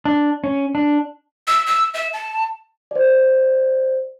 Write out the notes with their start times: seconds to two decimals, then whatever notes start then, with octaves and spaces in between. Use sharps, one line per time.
0.05 D4
0.44 C#4
0.75 D4
1.48 E6
1.66 E6
1.94 E5
2.13 A5
2.91 C5 D5